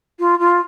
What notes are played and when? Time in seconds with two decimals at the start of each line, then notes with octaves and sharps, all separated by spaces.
0.19 F4
0.39 F4